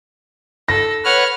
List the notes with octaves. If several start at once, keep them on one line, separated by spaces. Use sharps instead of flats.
A4 A#6
B4 C#5 F#5 F6